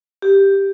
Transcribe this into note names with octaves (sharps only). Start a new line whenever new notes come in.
G4